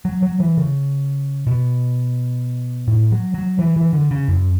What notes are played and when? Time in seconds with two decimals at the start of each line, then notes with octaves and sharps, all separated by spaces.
0.05 F#3
0.22 F#3
0.40 E3
0.57 C#3
1.47 B2
2.88 A2
3.12 F#3
3.34 F#3
3.59 E3
3.76 E3
3.93 D3
4.11 C#3
4.28 F#2